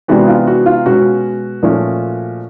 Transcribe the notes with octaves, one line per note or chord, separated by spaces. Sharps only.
C3 E3 G#3 B3 D4 F#4
F4
F#4
F4
B2 G#3 C#4 F#4
A#2 F3 A3 C#4